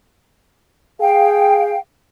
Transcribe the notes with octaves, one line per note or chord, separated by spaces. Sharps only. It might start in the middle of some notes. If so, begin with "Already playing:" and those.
G#4 F5 G5